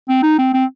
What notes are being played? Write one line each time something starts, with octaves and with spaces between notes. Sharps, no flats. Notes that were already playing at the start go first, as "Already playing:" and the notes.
C4
D#4
C4
C4